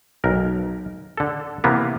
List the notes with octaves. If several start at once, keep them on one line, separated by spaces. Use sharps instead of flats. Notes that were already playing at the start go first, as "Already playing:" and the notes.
B1 A#4
D3 A4
C3 E3 A#3 B3